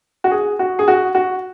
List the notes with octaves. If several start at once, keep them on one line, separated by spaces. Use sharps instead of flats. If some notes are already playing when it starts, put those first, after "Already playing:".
F#4
G#4
F#4
G#4
F#4
F#4